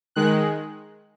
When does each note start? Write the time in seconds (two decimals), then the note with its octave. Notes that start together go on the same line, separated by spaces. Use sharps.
0.16 D#3 G#3 F#6